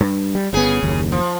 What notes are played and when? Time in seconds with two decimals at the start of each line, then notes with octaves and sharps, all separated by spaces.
0.01 G2
0.35 G3
0.53 G1 C#3 B3 G#4
0.83 F#1 D#2
1.12 F3